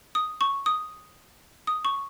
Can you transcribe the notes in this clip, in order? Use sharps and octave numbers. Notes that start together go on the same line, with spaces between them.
D#6
C#6
D#6
D#6
C#6